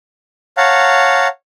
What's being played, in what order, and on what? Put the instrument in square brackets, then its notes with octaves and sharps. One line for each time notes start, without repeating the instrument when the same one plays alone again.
[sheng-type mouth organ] C#5 F5 F#5 A5 A#5